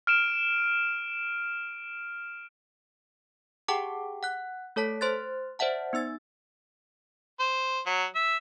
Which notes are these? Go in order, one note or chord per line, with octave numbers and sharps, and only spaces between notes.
F6 D7 E7
G4 G#4 F#5 G5 A5 D6
F#5 F#6
A3 A4 C#5 A5 B6
C5 C6 F#6 A6
C5 D5 E5 F#5 A5
B3 D#4 E6 A6
C5
F#3
E5